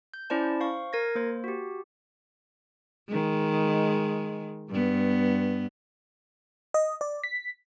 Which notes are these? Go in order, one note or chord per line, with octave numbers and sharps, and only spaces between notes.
G6
C#4 E4 C5 D5 A5
C5 F5 C#6
A#4 G#6 A#6
A#3 C5
F#4 G4
D#3 G#3
G2 B3
D#5
D5
B6